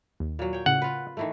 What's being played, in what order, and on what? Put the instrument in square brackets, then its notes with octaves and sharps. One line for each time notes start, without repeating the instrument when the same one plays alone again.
[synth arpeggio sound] D#2
[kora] A#2 F#3
C#5 G5
[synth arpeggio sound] A2 C#3 [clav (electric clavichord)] F#5
[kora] F4 B4
D#3 E3 A3